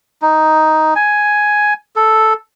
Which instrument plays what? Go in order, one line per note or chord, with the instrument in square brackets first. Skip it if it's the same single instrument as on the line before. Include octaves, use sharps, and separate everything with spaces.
[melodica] D#4
G#5
A4